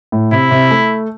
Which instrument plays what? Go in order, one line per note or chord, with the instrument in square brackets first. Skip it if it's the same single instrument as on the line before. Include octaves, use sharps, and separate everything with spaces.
[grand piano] A2
[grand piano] C3 [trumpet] E4
[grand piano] C3
A3